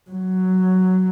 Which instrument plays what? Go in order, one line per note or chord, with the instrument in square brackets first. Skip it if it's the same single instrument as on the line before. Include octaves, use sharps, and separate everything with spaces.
[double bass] F#3